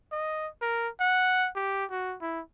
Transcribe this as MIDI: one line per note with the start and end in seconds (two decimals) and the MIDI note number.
0.12 0.48 75
0.62 0.89 70
1.00 1.48 78
1.56 1.85 67
1.90 2.16 66
2.21 2.41 64